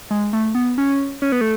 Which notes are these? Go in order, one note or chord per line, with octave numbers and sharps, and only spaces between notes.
G#3
A3
B3
C#4
C#4
B3
A3